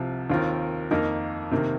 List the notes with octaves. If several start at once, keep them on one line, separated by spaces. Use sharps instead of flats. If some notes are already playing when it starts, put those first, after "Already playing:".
Already playing: C2 C3 F3
D#2 D#3 C4 F4 A#4
F2 D#3 A#3 D#4 A#4
C3 D#3 A#3